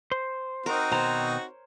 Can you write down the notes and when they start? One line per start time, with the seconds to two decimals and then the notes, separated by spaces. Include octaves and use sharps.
0.12 C5
0.66 C4 D#4 F#4 A#4
0.92 B2 D#3 C5 C#5 A#5